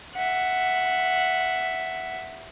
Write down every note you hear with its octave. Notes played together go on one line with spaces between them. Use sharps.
E5 F#5